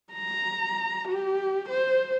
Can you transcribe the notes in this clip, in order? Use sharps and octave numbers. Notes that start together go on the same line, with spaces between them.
A#5
G4
C5